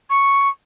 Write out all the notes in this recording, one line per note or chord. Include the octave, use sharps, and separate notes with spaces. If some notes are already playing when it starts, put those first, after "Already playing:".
C#6